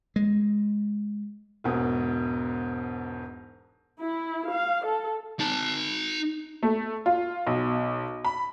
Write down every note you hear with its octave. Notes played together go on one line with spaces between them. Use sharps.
G#3
E1 G#2 B2
E4
F5
A4
D#4 A5
A3
F4
B1
B5